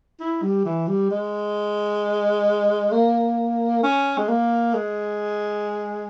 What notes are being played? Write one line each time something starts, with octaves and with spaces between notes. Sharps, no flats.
E4
G3
E3
G3
G#3
A#3
C#4
G#3
A#3
G#3